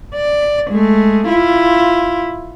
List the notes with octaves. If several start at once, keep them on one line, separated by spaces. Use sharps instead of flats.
D5
G#3 A3
E4 F4